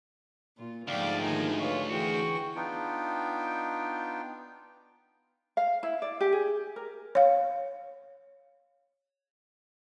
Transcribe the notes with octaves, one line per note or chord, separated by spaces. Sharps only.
A#2 F4
D2 G#2 F3 D5 F5 G5
D3 D#3 A#3 D#4 G#5
F4 B4 C#5
E3 F#4 G#4 G5 C#6
B3 D4 D#4 F4 G5
F5
E4
D5
G4
G#4
A#4
C#5 F5